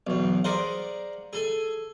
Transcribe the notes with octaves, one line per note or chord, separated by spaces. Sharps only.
B1 E2
G#4 A#4 C5 D5 F5 F#5
G#4 A4 G#5